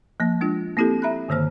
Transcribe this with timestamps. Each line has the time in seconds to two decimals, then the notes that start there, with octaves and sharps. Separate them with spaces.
0.20 F3 A#3
0.41 G#3 D4 F4
0.77 A#3 C4 E4 G4 A4
1.02 E5 A#5 B5 F#6
1.28 G2 D3 D#3 A#3 C5 F6